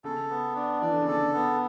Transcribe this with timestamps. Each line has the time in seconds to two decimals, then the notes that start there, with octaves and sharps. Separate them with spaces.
0.04 C#3 A4
0.30 B3
0.55 D4
0.81 E3 D5
0.91 D3
1.02 C#3
1.08 D3 A4
1.34 B3